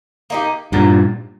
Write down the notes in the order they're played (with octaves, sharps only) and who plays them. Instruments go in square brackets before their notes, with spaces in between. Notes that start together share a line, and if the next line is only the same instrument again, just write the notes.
[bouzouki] A#3 D#4 G4
[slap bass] G2 A#2 [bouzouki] F#3